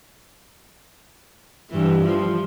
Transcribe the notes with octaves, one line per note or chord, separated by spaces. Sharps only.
G2 E3
F3